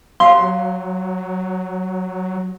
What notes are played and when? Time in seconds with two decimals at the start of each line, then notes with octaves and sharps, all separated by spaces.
0.20 F#3 F5 C6